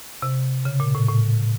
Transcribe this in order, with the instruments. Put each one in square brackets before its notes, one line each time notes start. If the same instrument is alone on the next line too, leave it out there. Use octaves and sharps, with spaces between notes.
[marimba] C3
C#3
A#2
A2
A2